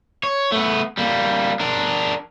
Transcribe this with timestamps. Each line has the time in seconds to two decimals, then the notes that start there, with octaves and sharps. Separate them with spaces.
0.23 C#5
0.52 A3 B3
0.98 G3 A#3
1.60 D4 A#4